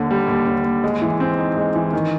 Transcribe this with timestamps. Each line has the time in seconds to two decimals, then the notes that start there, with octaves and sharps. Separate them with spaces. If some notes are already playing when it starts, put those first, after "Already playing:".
Already playing: D#2 D3
0.11 G3
0.28 D#2
0.46 D3
0.65 D#2
0.84 G#3
1.02 E3
1.20 C4
1.38 D#4
1.57 G#3
1.75 E3
1.93 D#3